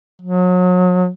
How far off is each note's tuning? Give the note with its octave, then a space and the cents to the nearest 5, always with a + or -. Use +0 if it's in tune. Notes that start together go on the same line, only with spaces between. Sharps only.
F#3 -35